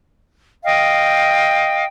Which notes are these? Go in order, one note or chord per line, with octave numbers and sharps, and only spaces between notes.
D#5 F5 G5